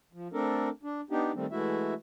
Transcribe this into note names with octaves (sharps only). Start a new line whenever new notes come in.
F3
A3 C4 D4 A4 A#4
D4
B3 D4 D#4 G4
D#3 G3 A3 C4
E3 G#3 A3 E4 F#4 E5